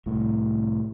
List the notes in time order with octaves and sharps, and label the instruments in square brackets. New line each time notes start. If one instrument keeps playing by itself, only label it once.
[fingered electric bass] C2 A2